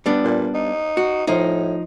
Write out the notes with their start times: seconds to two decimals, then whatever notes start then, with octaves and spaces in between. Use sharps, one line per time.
0.06 G3 B3 D4
0.24 A#2
0.54 D#4
0.97 F#4
1.27 A2 F3 D#4